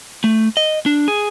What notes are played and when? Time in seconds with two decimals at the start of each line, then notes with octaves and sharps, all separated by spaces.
0.24 A3
0.57 D#5
0.86 D4
1.08 G#4